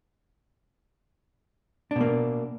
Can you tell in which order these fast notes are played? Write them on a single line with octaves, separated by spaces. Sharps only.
D4 B2 A#3